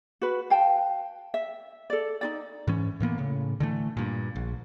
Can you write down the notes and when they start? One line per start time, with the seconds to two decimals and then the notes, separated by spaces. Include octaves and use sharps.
0.21 F#4 B4
0.50 F5 G5 A5
1.34 E5
1.90 A4 D5
2.21 D#4 F4 D5
2.67 G#2 E3 C#4
3.00 A2 E3 A#3 B3
3.18 A2 C#3
3.60 D3 E3 A3
3.97 G2 A#2
4.36 A#1